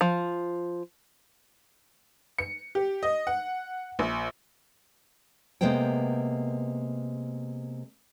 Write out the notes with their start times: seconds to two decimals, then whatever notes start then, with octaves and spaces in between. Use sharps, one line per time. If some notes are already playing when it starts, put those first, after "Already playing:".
0.01 F3
2.39 C#7
2.75 G4
3.03 D#5
3.27 F#5
3.99 A#1
5.61 C3 G#3 A#3 B3 C5 G5